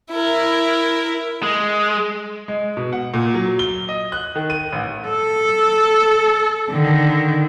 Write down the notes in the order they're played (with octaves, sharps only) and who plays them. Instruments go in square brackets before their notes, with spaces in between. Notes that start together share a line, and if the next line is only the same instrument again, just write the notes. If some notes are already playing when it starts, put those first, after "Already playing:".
[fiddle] E4 A#4
[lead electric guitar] G#3
[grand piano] G#3
B2
F#5
A#2
F#3
G7
D#5
F#6
D#3
D#7
A1
[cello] A4
D3 D#3